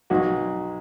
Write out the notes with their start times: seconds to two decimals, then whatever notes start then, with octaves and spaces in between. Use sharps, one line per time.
0.10 B1 F#4